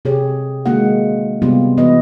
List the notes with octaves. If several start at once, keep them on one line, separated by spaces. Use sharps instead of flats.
C3 G4 G#4 C#5
D3 D#3 G#3 A#3 F#4 F#5
C3 G3 B3 F4 G4
E3 B3 F#4 B4 D#5